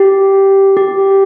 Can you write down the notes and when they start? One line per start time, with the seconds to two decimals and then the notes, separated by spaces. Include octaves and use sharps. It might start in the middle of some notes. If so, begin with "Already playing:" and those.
Already playing: G4
0.77 G4